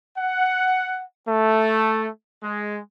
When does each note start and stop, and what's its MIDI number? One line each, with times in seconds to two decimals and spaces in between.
0.18 1.02 78
1.28 2.09 57
2.43 2.80 56